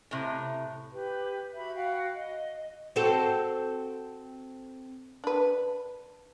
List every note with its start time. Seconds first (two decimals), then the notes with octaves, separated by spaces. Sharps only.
0.11 A2 C3
0.93 G4 B4
1.56 F#4 E5 B5
1.75 F#4 F5 G5
2.16 D#5
2.96 C4 F#4 A4
5.24 D4 B4